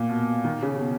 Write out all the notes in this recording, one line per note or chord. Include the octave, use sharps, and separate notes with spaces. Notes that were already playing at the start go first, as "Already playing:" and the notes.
Already playing: A#2
B2
D#3
C#3
B2